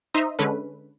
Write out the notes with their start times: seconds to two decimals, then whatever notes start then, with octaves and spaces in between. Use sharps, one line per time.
0.14 D#4 C5 E5 A#5 C6 D#6
0.39 D3 G#3 C#4 A4 B4